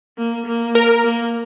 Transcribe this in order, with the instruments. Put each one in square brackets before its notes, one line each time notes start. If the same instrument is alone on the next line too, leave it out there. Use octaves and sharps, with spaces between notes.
[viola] A#3
A#3
[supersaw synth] A#4
[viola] A#3